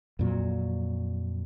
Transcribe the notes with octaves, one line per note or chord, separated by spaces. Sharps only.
F2 A#2 F#3